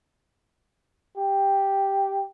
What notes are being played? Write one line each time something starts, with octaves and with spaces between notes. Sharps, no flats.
G4